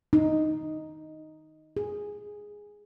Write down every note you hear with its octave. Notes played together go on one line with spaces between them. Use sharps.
D#4
G#4